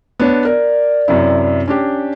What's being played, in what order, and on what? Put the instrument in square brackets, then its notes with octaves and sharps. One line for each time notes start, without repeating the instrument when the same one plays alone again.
[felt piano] B3 D4 C#5
[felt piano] A#4 [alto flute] D5
[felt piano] F#2 C3 E4
C#4 D4 G4